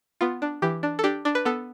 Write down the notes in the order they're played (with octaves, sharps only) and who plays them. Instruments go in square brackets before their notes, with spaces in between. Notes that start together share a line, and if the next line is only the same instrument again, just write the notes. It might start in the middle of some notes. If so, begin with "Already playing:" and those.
[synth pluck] B3 F4
D4
E3 G4
D4
A4
D4 G4
D4
B4
B3 A4